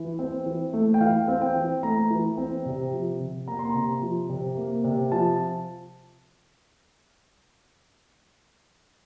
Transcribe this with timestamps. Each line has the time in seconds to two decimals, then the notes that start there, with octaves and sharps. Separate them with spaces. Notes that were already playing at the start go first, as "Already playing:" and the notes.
Already playing: E3
0.19 C4
0.46 E3
0.73 A3
0.94 G5
1.01 E3 F5
1.28 C4
1.42 G5
1.56 E3
1.83 A3 A#5
2.11 E3
2.38 C4
2.66 C3
2.93 F3
3.20 C3
3.48 A#3 A#5
3.59 C6
3.70 A#5
3.75 C3
4.02 F3
4.30 C3
4.57 A#3
4.84 C3
5.12 F3 A5